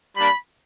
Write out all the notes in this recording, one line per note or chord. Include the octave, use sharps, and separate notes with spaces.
G3 A#3 D4 B5